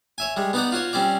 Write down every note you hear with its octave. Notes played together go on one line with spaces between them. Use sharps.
C#5 E5 G#5
G3 G#3
B3 D#4 D5 F#5
F4 F#4 C#5
G3 C4 C#4 D5